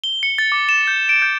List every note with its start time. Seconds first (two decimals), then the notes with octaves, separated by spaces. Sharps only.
0.04 G7
0.23 C#7
0.38 A6
0.52 D6
0.69 E7
0.87 G6
1.09 D7
1.22 G6